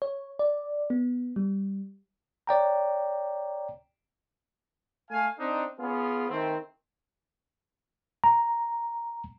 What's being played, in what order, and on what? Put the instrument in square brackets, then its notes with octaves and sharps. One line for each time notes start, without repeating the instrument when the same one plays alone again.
[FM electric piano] C#5
D5
B3
G3
[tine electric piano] C#5 D5 G5 A#5
[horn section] A3 F5 G#5
C4 D4 D#4
B3 C#4 F4 G#4
D#3 A3 C4
[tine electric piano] A#5